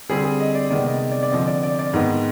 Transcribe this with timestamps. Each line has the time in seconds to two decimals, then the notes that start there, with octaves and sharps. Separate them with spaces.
0.09 D3 G3 C4 G#4
0.24 G#4
0.40 D#5
0.55 D5
0.70 C3 D#3 G#3 B3 D5
0.86 D#5
1.12 D5
1.23 D5
1.32 D3 F3 C4 D#5
1.47 D5
1.63 D5
1.79 D5
1.94 G#2 D#3 B3 D#5